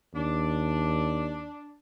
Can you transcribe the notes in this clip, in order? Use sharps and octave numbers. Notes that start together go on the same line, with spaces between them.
D#2 D4